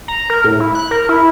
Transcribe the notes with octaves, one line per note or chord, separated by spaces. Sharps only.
A#5
A#4
A2
E4
F#6
A#4
E4